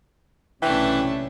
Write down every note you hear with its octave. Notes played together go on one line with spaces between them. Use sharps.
B1 C3 E3 A3 C#4 D4 G5